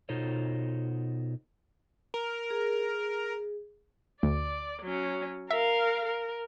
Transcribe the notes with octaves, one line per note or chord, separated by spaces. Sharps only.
B2 D#4 F4 A4 C5 C#5
A#4
G#4
D2 D5
F#3 C#4
A#4 E5 F5
A#4